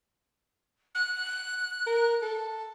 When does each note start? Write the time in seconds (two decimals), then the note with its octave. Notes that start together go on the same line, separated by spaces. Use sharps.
0.94 F#6
1.87 A#4
2.22 A4